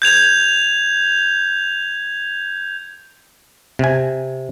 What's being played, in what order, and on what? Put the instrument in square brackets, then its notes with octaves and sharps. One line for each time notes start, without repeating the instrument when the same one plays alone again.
[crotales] G6 G#6 F7
[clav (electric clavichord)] C3 G#5